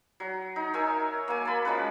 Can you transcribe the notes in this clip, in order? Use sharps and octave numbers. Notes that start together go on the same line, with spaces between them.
F#3
D#4
A#4 C#5 E5 G#5
A#3 G#5
A5 B5
F3 G#3 C#4 B4